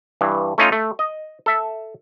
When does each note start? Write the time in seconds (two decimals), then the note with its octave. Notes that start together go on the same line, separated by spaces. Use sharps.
0.21 G2 E3
0.58 A3 C#4 D#4 F4
0.72 A3
0.99 D#5
1.46 A4 E5